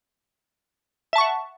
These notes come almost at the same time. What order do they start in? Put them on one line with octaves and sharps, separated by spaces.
E5 A5 C#6 F#5